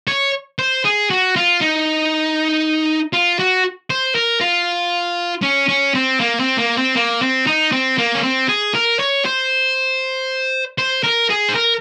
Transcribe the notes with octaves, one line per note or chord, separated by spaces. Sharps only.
C#5
C5
G#4
F#4
F4
D#4
F4
F#4
C5
A#4
F4
C#4
C#4
C4
A#3
C4
A#3
C4
A#3
C4
D#4
C4
A#3
C#4
C4
G#4
A#4
C#5
C5
C5
A#4
G#4
C5
A#4